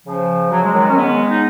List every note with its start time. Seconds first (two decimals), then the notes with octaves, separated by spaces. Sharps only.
0.05 C#3 F3
0.50 F#3
0.61 G#3
0.72 D#3 F#3
0.88 C#4
0.95 G#3 B3
1.29 D#4